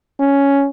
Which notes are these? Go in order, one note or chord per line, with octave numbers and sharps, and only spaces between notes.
C#4